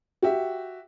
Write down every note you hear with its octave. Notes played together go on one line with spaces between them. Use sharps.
F#4 G4 E5